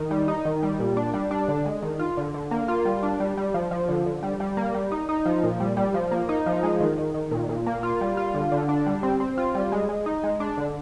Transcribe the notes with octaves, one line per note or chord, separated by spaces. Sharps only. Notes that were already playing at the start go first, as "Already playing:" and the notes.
Already playing: D#3
G3
D#4
D#3
G3
A#2
D4
G3
D4
D3
G#3
D#3
F4
D3
D3
A#3
F4
G3
D4
G3
G3
F3
F3
D3
D3
G3
G3
A#3
G3
D#4
D#4
F3
A#2
G3
G3
F3
A#3
D#4
F3
G#3
D#3
D#3
D#3
A#2
A#2
A#3
F4
G3
F4
D3
D3
D4
G3
C4
C4
F4
G3
G#3
G#3
D#4
G#3
D4
D3